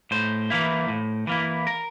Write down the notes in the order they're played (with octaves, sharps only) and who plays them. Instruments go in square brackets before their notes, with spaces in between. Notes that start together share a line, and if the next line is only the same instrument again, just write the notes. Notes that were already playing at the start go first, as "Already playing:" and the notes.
[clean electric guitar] A2 C5
E3 A#3 E4
A2
E3 A#3 E4
A#4